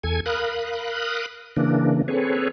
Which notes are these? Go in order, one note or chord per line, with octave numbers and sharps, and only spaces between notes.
E2 A4 G#5 G#6
A#4 F5 B5 D#6 F#6
C#3 E3 A#3 D4
C4 G#4 A4 B4 C#5